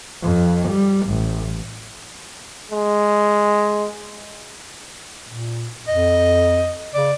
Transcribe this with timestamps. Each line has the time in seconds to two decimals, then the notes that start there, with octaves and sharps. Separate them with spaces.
0.22 F2
0.69 G3
1.07 A1
2.71 G#3
5.28 A#2
5.88 F2 D#5
6.94 C#3 D5